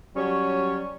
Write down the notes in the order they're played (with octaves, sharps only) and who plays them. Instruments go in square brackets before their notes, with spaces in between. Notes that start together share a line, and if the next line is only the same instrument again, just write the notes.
[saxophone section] F#3 G3 C#4 C#5